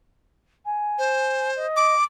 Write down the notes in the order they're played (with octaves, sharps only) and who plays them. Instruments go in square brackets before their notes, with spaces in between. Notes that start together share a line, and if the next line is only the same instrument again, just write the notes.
[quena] G#5
[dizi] C5
[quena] D#5
[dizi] D6